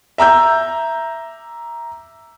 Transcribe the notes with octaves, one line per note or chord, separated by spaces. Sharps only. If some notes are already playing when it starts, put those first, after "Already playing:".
E5 A#5 E6 G6